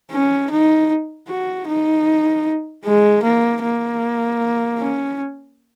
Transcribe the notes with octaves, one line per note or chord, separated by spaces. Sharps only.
C#4
D#4
F#4
D#4
G#3
A#3
A#3
C#4